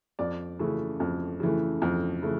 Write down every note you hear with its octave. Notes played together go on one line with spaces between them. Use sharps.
F2 D5
C#3 E3 A3
F2
C#3 E3 A3
F2
C#3 E3 A3